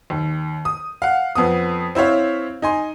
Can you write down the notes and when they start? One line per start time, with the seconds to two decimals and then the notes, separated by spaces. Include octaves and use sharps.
0.10 D#2
0.65 D#6
1.02 F5 F#5
1.35 F2 B3 D#6
1.95 C4 E4 C5 C#5 F5
2.62 D#4 G#5 C6